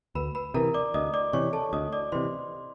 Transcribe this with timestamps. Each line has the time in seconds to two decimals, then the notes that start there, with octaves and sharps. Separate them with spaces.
0.15 D2 B4 B5
0.35 B4 B5
0.54 C3 E3 A#4 A#5
0.74 D5 D6
0.94 D2 D#5 D#6
1.14 D5 D6
1.33 C3 E3 C#5 C#6
1.53 A4 A5
1.73 D2 D#5 D#6
1.93 D5 D6
2.12 C3 E3 C5 C6